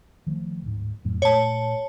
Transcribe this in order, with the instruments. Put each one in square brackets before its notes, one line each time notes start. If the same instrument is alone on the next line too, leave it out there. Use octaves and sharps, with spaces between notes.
[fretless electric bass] D#3 F3 A3
D1 G#2
F2 A2 F#3
[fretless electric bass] A#2 A3 [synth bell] C#5 A5